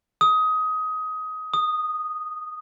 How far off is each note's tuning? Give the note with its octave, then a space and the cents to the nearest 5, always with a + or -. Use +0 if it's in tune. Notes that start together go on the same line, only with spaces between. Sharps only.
D#6 +20
D#6 -10